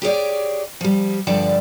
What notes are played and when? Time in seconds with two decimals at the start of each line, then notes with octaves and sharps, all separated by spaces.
0.02 G4 G#4 C#5 D5
0.81 F3 G3
1.27 G2 D3 F3 D5 A5